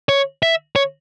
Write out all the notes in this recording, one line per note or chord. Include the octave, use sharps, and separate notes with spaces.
C#5
E5
C#5